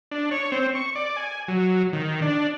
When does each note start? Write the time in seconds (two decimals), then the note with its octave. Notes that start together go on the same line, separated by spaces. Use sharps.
0.11 D4
0.31 C#5
0.52 C4
0.75 C#6
0.95 D5
1.17 G#5
1.48 F#3
1.93 D#3
2.22 D4